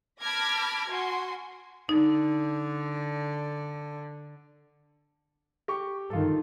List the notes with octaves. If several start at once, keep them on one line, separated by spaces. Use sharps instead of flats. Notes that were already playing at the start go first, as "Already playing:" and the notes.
A5 B5 D6 F6 G#6 A#6
F#4 G#5 C6
D3 D#4
G4 C#6
G2 D#3 F4 A4